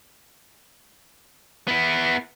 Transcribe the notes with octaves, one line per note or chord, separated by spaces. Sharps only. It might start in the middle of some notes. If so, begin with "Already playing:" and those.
B3 E4